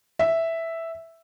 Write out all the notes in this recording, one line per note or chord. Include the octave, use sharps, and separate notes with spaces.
E5